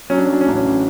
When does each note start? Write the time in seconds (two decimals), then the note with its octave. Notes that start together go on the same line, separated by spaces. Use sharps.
0.10 F#3 C#4
0.18 D4
0.25 C#4
0.28 F#3 D4
0.41 C#4
0.46 A1 D4
0.56 C#4
0.65 A1